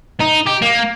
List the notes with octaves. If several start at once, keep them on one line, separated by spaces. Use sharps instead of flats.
D#4
G4
A#3